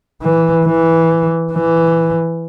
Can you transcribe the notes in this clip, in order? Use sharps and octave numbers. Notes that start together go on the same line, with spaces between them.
E3
E3
E3